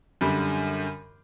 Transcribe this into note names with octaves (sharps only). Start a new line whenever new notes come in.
F#2 D3 G3